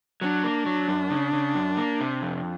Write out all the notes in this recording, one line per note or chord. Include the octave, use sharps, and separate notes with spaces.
F#3 D4
A#3
F#3
F#2
C#3
C#3
F#2
A#3
C3
F2